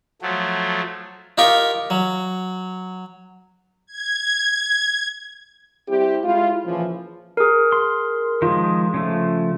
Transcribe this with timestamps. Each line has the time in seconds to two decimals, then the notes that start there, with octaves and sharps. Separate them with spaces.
0.22 F3 F#3 A3
1.38 D#4 F4 G4 A#4 C#6
1.90 F#3
3.86 G#6
5.88 G3 C4 E4 G4
6.24 G#3 E4 F4
6.65 A#2 C#3 E3 F3
7.37 G#4 A#4
7.72 C6
8.42 D#3 F3 G#3 F4
8.94 C#3 F3 A3